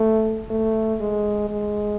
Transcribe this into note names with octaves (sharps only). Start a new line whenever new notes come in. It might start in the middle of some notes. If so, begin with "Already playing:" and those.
Already playing: A3
A3
G#3
G#3